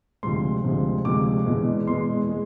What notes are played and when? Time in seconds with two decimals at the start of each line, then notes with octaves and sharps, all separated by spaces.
0.23 D2 C3 F3 G#3 C6
0.64 D2 C3 F3 G#3
1.05 D2 C3 F3 G#3 D6
1.46 E2 B2 G#3
1.87 E2 B2 G#3 C6
2.29 G#3